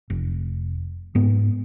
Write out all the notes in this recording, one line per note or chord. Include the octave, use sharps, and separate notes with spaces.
F1
G#2 B3